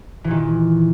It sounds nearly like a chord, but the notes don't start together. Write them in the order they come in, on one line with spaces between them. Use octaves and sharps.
E3 A#2 D#3